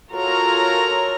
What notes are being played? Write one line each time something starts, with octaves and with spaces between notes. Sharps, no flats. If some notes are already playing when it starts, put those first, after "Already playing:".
F4 F#4 A4 A#4 C#5 A#5